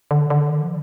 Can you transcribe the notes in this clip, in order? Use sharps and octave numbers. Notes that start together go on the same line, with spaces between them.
D3
D3
D#3
F3